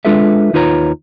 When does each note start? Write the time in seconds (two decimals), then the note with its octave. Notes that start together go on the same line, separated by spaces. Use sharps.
0.05 G#3 D4 F4 A4 B4 E5
0.53 D#2 D#4 F4 B4 C#5 A#5